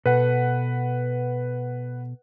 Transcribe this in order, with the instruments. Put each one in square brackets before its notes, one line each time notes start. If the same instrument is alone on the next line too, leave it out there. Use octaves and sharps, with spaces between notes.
[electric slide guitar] B2 A4 [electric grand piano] B4 F#5